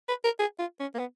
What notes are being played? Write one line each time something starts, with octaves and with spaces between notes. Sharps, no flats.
B4
A#4
G#4
F4
C#4
A#3
B3